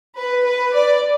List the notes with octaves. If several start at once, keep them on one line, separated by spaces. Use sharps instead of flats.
B4
B4
D5